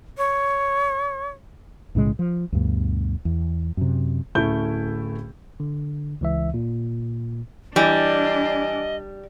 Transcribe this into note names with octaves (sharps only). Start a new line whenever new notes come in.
C#5
B1 A2 C#3 G#3
F3
D2 G2 B2
E2
F#2 C3
D1 A3 C#4 E4 G6 G7
D3
C#2 E3 E5
A#2
E3 G3 D4 D#5